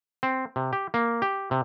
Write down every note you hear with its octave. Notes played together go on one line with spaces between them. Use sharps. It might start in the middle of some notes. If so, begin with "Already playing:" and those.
C4
C3
G4
A#3
G4
C3